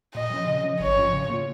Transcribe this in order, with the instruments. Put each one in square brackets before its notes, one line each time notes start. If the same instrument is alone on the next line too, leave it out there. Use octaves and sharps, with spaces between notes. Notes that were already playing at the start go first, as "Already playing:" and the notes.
[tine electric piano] A#2 [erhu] D#5
[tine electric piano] F3 C#4
C#3
F3 C#4
[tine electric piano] G#1 [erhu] C#5
[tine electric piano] G#2 F3 C#4 F4
C#3
A#3 F4